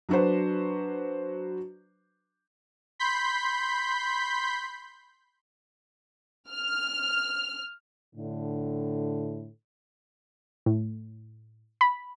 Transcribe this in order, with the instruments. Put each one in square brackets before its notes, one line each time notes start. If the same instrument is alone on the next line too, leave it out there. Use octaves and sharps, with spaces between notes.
[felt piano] F#3 D4 F#4 B4 C5
[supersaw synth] B5 C6 G6 B6
[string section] F6
[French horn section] A2 D3
[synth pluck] A2
B5